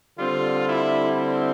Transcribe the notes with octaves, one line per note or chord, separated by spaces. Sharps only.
D3 G3 C4 F4
E4
E4